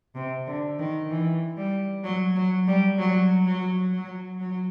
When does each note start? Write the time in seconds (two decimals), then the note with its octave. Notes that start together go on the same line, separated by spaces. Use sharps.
0.15 C3
0.47 D3
0.79 D#3
1.10 E3
1.57 G3
2.04 F#3
2.35 F#3
2.67 G3
2.98 F#3
3.46 F#3
3.93 F#3
4.40 F#3